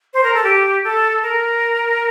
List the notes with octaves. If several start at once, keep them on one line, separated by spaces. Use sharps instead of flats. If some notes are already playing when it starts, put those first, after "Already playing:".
C5
A#4
A4
G4
A4
A#4